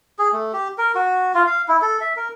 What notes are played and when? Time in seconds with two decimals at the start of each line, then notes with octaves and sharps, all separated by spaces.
0.19 G#4
0.33 A3
0.53 G4
0.78 A#4
0.95 F#4
1.35 F4
1.47 F5
1.68 E4
1.82 A4
2.01 E5
2.16 A#4